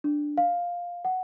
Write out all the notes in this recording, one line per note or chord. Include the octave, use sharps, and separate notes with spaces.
D4
F5
F#5